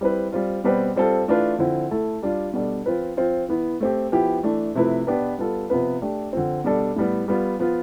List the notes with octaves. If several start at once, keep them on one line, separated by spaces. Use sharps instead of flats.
G3 C4 E4 B4
G3 C4 F4
B2 G3 C4 G4 B4
G3 C4 F4 A4
E3 A3 D4 F4 B4
D3 F3 C4 E4
A3 E4 A4
G3 D4 F4
B2 G3 D4 A4
F3 C4 F4 B4
F3 C4 F4
E3 B3 E4
A3 C4 G4
F3 B3 E4 G4
E3 A3 D4
C3 F3 A3 E4 B4
B2 B3 D4 G4 B4
G3 B3 F4 A4
C3 F3 B3 F4 B4
A3 D4 G4
D3 F3 C4
B2 G3 D4 A4
A2 G3 B3
G3 B3 F4
F3 B3 F4